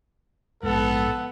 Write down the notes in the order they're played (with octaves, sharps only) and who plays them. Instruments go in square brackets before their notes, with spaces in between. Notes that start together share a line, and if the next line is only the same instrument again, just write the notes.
[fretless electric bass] A#1 G#2 [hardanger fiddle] B3 F#5 [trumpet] A4